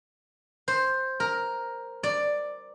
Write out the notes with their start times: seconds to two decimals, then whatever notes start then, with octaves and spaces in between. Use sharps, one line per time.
0.68 C5
1.20 A#4
2.03 D5